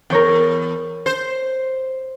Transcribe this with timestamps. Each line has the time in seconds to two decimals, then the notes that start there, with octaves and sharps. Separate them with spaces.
0.10 E2 A#4 C#5 G5
1.06 C5 G6